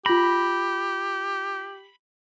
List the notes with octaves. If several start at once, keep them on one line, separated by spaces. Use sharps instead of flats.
F4 G4 B5 A#6